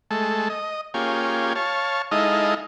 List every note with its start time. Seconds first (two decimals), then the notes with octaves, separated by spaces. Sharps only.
0.11 G#3 A3 A4
0.49 D#5
0.94 A#3 C#4 F4 G4 G#4
1.56 C#5 F5 A5
2.11 G#3 D#4 E4 A4 D#5 F5